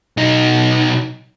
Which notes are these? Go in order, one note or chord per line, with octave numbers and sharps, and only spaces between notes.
B1 D#4